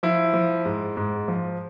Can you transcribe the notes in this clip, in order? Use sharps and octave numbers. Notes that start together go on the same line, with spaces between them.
F3 E4
F3
G#2
G#2
F3